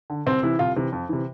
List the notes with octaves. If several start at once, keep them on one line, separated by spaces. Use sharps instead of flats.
D3
C2 C4
C3 E3 E4
C2 F4
C3 E3
F2
C3 E3